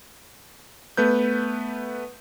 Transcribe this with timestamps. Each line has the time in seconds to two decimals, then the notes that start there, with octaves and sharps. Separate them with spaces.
0.97 A3 B3 B4 G6